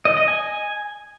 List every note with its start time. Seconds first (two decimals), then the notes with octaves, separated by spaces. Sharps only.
0.05 D#5
0.17 D#5
0.28 G#5